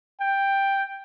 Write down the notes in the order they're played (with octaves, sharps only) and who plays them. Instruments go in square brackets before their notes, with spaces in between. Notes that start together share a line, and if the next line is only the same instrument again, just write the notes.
[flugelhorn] G5